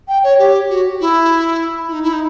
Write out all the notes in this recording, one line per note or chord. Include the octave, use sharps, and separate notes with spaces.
G5
C#5
G4
F#4
E4
E4
D#4
E4
D#4